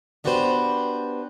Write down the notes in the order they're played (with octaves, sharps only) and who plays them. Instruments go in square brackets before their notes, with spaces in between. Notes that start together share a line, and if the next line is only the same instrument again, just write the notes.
[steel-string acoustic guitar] B3 D4 F#4 G4 B4 C5